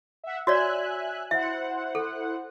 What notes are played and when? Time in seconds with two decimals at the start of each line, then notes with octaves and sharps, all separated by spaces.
0.24 E5 F#5
0.47 F#4 C#5 D5 E5 G#5 F#6
1.31 E4 C5 E5 F#5
1.95 A4